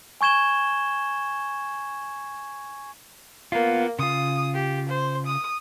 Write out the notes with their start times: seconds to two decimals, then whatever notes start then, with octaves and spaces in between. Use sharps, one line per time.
0.21 G#5 C#6 G#6 E7 G7
3.52 A#3 B3 F4
3.99 C#3 F4 D#6
4.54 G4
4.89 C5
5.27 D#6